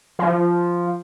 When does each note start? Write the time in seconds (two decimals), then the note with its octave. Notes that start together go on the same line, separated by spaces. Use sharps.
0.19 F3